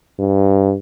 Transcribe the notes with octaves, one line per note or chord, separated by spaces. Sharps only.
G2